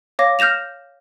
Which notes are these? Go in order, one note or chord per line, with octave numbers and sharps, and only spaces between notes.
C#5 F5 D6 A#6
F6 G6 A#6 E7 F7